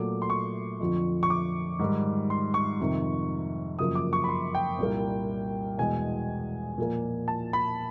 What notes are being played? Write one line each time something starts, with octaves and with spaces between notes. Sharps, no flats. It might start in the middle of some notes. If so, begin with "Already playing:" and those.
Already playing: A#2 F#3 A3 D6
C6
C#6
F2 D3 F3
C#6
D6
G#2 D#3 G3
C6
C#6
F2 C3 D#3
F#2 C#3 F3 A#3 D#6
D6
C#6
B5
C6
G5
C2 A#2 G3 A#3
E2 B2 G#3 G#5
A#2 F3 A#3
A5
B5